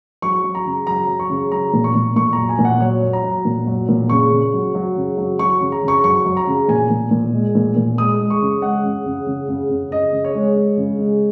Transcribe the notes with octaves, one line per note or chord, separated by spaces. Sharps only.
F#3 C#6
F#3
A#5
C#3
F#3 A#5
F#3
C#6
C#3
F#3 A#5
A#2
C#6
A#2
A#2 C#6
F#3 A#5
G#5
A#2
F#5
F#3 C#5
F#3
A#5
F#3
A#2
F#3
A#2
C#3 C#6
C#3
F#3
F#3
C#3
F#3
F#3 C#6
C#3
A#5
C#3
C#6
F#3 C#6
F#3
A#5
C#3
A#2 G#5
A#2
A#2
G#3
A#2
A#2
G#3 D#6
G#3
C#6
C#3
G#3 F#5
C#3
C#3
C#3
C#3
C#3
C#3 D#5
C#3
C#5
G#3
G#3
C#3
G#3